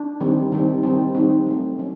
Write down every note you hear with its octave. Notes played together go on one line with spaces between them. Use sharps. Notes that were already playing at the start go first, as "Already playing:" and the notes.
Already playing: D4
D#3 G3 C4
D#3 G3 C4
D#3 G3 C4
D#3 G3 C4 D#4
F#3 A3 C4
F#3 C#4